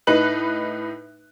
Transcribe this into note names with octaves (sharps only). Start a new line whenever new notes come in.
A2 D#4 B4 F#6 F#7